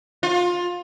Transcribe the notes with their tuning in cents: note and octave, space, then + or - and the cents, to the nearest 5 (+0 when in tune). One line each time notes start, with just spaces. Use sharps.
F4 +20